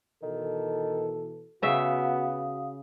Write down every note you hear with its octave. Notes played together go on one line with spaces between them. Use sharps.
B2 D#3 E3 A4
C#3 B3 F#4 E5 F5 D#6